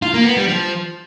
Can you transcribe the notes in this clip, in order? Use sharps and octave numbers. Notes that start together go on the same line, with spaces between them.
F4
A#3
B3
G3
F3